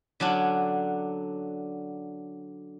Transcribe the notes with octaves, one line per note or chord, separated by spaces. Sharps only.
D3 F#3 C#4 D4